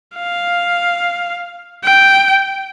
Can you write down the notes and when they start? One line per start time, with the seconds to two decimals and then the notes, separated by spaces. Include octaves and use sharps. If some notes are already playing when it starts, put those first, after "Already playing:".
0.17 F5
1.84 G5